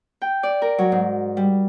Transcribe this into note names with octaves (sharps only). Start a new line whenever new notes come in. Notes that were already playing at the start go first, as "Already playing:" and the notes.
G5
D5
A#4
F#3
G#2
G3